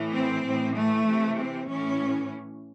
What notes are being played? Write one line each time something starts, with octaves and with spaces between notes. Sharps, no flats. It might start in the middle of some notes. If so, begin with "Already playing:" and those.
Already playing: A2 E3
C4
A2 E3
A3
C3 E3
C4
A2 E3 C#4